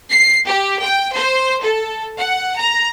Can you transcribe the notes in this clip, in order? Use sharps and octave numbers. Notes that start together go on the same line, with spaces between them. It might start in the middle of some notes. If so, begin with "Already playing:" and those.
C7
G4
G5
C5
A4
F#5
A#5